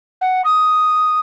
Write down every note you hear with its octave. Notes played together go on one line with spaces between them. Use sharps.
F#5
D#6